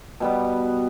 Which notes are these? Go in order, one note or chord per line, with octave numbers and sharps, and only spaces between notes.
B2 G3 B3